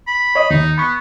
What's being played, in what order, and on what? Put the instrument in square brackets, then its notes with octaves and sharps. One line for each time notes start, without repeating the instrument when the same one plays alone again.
[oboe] B5
[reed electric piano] C#5 D#5 D#6
[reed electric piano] D#2 [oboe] D#4
[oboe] B3 [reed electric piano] B5 C#6